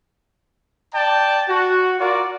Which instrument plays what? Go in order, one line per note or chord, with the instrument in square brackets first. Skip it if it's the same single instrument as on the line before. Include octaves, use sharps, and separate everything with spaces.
[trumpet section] D5 G5 A5
F#4
F4 F#4 A#4 D5